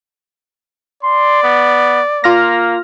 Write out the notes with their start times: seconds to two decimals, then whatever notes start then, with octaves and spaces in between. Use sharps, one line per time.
1.03 D5 C6
1.43 B3
2.24 A#3 F4 F6 A#6